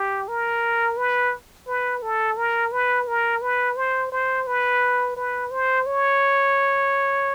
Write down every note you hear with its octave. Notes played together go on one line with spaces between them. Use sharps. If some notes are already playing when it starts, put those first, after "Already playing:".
Already playing: G4
A#4
B4
B4
A4
A#4
B4
A#4
B4
C5
C5
B4
B4
C5
C#5